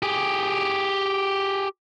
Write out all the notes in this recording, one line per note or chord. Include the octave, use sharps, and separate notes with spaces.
G4 G#4